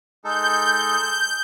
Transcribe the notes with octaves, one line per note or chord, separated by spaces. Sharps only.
G#3 D#4 A4 G6